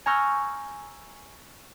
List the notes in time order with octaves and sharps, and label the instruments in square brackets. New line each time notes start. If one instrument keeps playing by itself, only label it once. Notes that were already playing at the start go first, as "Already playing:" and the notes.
[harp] G#5 A#5 C#6 E6 F6 G6